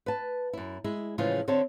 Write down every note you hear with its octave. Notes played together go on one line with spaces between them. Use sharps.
B4 A5
F#2 E4
G#3 E4
A2 C#3 E3 F3 G#3 F4
D3 C4 C#5 E5 A5